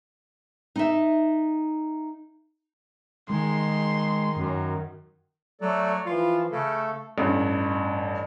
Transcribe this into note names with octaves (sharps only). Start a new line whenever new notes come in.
D#4 E5
D#3 G#3 C6
F#2
F#3 A3 A4 D5
E3 F3 F4
C#3 A3 A4
A1 G2